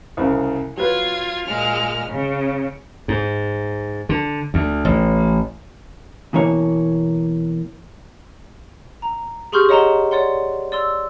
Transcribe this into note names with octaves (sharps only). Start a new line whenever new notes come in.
C2 C#3
F#3 F4 B4 G#6
A#2 G#3 F6
C#3
G#2
D3
D2
A1
B2 E3 A#3 C#5
A#5
G4 G#4 C6 C#6 F6 G6
C#5 D#5 F#5 A#5 E7 G7
C#5 D5 F#5 C6
D5 C6 E6